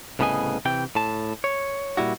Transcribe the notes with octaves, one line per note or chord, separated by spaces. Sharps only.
C2 A2 C#3 B3 D#5 G#5
C3 E3 G5
A2 A5
C#5
A#2 G3 E4 F#4